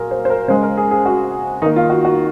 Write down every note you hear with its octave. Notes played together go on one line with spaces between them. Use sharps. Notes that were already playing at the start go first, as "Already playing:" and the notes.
Already playing: A#2 F#3 G#4 A#4
C5
C5
A#4
C#3 G#3 C5
A#4
G#4
G#4
F#4
D#3 A#3 D#4
F4
F#4
F#4